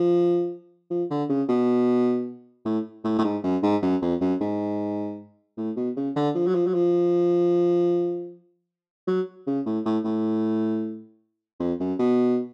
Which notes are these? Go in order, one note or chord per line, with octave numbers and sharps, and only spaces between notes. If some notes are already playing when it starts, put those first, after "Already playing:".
Already playing: F3
F3
D3
C#3
B2
A2
A2
A2
G#2
F#2
G#2
F#2
F2
F#2
G#2
A2
B2
C#3
D3
F3
F#3
F3
F#3
F3
F#3
C#3
A2
A2
A2
F2
F#2
B2